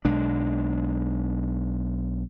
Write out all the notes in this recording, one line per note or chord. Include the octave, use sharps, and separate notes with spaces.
B1 G#3 D4